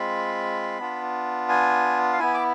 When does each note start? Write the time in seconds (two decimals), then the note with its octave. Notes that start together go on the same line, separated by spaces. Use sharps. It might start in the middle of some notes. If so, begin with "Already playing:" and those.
Already playing: G#3 C4 F4 B5
0.79 B3 D4 F4
1.49 G#5
2.13 F5
2.19 B3 E4 G#5
2.34 D6